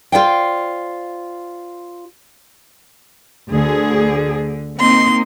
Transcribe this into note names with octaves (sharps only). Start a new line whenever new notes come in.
F4 A4 C5 D5 F5 G5
D2 D3 G#4
A#3 C4 D#4 C6